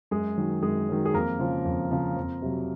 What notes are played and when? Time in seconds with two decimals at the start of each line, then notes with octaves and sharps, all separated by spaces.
0.11 F#2 G#3 G#4
0.37 D#3 F#3
0.62 F#2 G#3 G#4
0.89 D#3 F#3
1.05 G#4
1.14 F2 A#3 A#4
1.39 C#3 F3
1.65 F2
1.91 C#3 F3
2.17 F2
2.42 C3 F#3